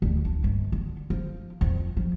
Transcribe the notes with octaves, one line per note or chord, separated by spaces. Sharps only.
D2
D4
G1
D3
F3
F2
F3